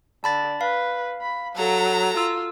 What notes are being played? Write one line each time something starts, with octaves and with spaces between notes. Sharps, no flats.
D3 A5 B5 A6
B4 F5
B5
F#3 A4 A#5
F4 E6